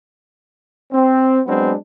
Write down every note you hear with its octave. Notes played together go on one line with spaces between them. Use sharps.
C4
F#3 G#3 B3 C4 D4